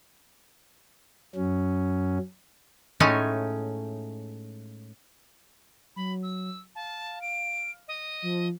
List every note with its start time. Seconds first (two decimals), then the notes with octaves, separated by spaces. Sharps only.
1.35 F#2 F#3 C#4
3.00 A2 G#3 A3 C#4 D#4 G#5
5.96 F#3 B5
6.23 E6
6.75 F5 A5
7.22 D7
7.88 D#5
8.22 F3